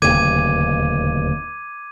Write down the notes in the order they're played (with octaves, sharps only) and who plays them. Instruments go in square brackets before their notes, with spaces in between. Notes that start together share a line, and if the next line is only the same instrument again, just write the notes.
[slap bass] D1 D#2 C#3 [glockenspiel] D6 G#6 D#7